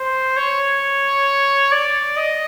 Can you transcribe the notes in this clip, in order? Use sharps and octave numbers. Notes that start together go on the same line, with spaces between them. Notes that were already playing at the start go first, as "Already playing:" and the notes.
Already playing: C5
C#5
D5
D#5